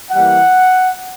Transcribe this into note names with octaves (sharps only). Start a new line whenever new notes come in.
E3 G3 A#3 F#5